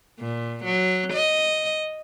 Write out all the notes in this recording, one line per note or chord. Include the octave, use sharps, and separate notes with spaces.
A#2
F#3
D#5